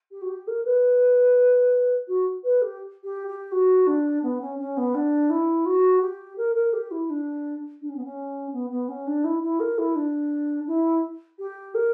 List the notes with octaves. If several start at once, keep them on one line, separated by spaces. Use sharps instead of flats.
G4
F#4
G4
A#4
B4
F#4
B4
G4
G4
G4
F#4
D4
B3
C#4
C#4
B3
D4
E4
F#4
G4
A#4
A#4
G4
E4
D4
D4
C#4
B3
C#4
B3
B3
C#4
D4
E4
E4
A#4
E4
D4
E4
G4
A#4